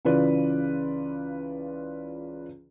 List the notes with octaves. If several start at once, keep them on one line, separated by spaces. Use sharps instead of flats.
C#2 C#3 E3 F4 B4 D5